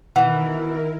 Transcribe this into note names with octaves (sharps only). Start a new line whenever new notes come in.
B2 D#3 E3 E4 A#4 F#5